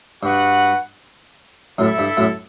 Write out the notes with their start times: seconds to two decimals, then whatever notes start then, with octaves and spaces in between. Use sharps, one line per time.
0.22 G2 F#4 B4 F#5
1.78 F#2 A2 E4 A4 E5
1.99 G2
2.17 F#2 A2